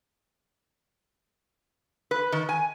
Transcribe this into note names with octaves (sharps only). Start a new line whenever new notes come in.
B4
D#3
G#5